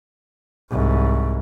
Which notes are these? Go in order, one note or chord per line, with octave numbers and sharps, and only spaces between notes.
C2 G#2